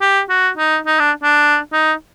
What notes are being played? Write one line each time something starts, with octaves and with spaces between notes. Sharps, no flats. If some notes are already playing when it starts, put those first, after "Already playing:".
G4
F#4
D#4
D#4
D4
D4
D#4